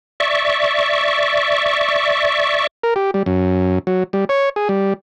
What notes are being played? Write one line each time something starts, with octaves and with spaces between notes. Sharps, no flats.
D5 E5 C#6
A#4
G4
G3
F#2
F#3
G3
C#5
G#4
G3